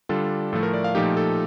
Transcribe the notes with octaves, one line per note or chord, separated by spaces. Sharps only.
D3 G3 D4 F4 A4
A2 F3 A3 A4
A#4
D5
F5
A#2 F3 A3 D#4 G4
A4